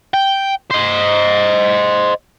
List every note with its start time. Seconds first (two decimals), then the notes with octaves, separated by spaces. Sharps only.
0.14 G5
0.71 C5 D#5